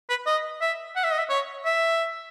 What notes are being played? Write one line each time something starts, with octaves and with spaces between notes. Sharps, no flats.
B4
D#5
E5
F#5
E5
D#5
E5
C#5
E5